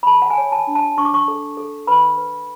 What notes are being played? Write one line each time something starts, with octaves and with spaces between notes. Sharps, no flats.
B5
A4 A5
F#5
G#5
C#5
A5
D4
A5
D4 C#6
D6
C#6
A4
A4
B4 B5
B4